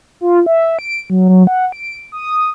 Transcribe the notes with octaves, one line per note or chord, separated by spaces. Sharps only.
F4
E5
D7
F#3
F#3
F#5
D7
D#6